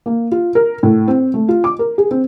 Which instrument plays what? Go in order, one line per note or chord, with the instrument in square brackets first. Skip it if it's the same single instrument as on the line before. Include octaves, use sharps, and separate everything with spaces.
[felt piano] A#3
F4
A#4
A2
C4
A3
F4
D6
A#4
G#4
C4